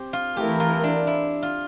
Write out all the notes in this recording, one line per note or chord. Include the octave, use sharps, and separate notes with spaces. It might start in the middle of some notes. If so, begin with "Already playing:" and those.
Already playing: C4 G4
F4
E3 A3 E4 G4 A#4
F4
D4
E4
F4